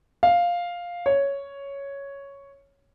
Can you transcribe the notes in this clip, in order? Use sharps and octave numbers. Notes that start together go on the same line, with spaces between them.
F5
C#5